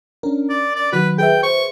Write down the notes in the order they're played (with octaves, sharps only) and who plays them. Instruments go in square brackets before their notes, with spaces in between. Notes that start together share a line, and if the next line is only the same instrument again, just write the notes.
[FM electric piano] C#4 D4 A#4
[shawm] D5
D5
[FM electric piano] D#3 F#3 F#4 [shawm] B4
[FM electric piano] G#4 B4 E5 [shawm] G5
[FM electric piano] C5 [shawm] C#6